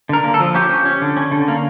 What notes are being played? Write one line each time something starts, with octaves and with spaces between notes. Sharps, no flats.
D3 A#4
A#3
A4
F3
C#4 G4
C#4
C#4
D3
C#4
D3
A#3